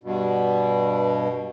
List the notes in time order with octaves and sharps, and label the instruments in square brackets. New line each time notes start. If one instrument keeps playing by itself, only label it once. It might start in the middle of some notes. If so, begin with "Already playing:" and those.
[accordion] G2 B2